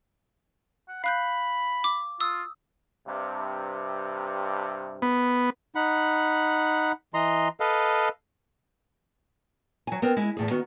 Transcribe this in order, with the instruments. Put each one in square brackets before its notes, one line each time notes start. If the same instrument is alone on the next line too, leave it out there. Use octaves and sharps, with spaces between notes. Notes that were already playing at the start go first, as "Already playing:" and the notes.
[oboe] F#5
[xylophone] F5 F#6 G6 [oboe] B5
[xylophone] D6
[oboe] F4 [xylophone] D#6 E6
[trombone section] G2 C3
[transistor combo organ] B3
[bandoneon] D#4 F#5 B5
E3 D#5 A#5 C6
A4 B4 D#5 F5
[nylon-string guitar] F#3 G#5
B3 C4 A#4
G#3 E4
E2 A2 G#4
D#3 B3 F#4